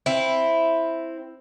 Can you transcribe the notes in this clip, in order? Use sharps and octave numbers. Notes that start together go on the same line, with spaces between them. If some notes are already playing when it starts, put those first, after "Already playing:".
C4 E4